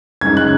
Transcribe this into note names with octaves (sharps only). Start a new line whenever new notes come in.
F#2 C#3 G#3 D#4 G#6
F#6